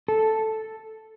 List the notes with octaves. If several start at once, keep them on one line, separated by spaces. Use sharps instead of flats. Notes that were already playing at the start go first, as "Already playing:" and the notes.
A4